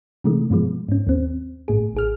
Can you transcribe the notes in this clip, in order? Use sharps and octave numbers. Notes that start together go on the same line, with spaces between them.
C3 D#3 E3 G#3 A3
G2 B2 F3 G#3
G#2 C#4
D#2 C4
G1 A2 G#4
A1 G#4 F6